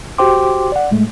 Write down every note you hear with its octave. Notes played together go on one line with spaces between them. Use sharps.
F#4 G4 C5 G5 C6 D6
D5 F#5
A2 G#3 A3